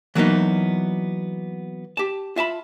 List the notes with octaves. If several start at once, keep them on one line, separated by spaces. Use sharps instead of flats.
E3 F#3 A#3 B3 D#4
G4 A5
F4 E5 A5 B5